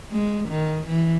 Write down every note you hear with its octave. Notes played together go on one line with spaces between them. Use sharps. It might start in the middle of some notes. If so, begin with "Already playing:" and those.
G#3
D#3
E3